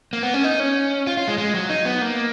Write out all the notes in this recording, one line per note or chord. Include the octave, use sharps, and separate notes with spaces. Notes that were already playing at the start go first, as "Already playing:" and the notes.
A#3
B3
C#4
D#4
C#4
F4
F4
G#3
G#3
F#3
D#4
B3
A#3